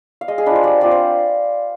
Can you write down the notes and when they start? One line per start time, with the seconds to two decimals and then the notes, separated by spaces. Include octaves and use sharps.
0.21 F5
0.28 G#3 D#5
0.38 G#4
0.46 D4 F4 B4
0.56 C5
0.63 G3 D5
0.81 C4 F4 D5
0.91 C5